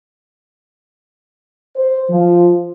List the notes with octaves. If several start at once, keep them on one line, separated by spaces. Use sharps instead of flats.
C5
F3